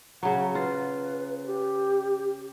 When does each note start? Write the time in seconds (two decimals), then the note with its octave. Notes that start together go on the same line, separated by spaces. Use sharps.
0.23 C#3 F#3 F#5
0.55 F4 B4
1.46 G4